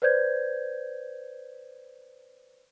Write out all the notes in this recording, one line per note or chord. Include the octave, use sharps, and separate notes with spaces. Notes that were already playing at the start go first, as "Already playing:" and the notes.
B4 C5 D5 G6 G#6